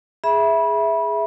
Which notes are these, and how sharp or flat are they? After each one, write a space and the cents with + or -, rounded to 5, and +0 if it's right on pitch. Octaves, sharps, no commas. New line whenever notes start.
G#4 +0 E5 +0 B5 -25